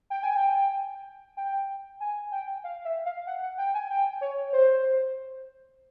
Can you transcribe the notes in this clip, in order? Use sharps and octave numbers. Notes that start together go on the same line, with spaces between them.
G5
G#5
G5
G5
G#5
G5
F5
E5
F5
F#5
F#5
G5
G#5
G5
C#5
C5